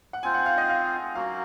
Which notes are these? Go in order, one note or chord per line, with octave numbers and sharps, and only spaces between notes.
F#5
C4 F4 C5 G#5
F#5
F5
D#5
F5
F#3 A#3 C#4 F#4 F5